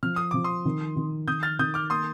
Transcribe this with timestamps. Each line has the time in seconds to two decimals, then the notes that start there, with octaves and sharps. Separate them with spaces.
0.03 F3 F6
0.16 D#6
0.31 F3 D6
0.44 C6 D#6
0.65 D#3
0.96 D#3
1.28 D#3 D#6 G6
1.43 F6 A6
1.59 D#3 D#6 G6
1.74 D6 F6
1.90 A#3 C6 D#6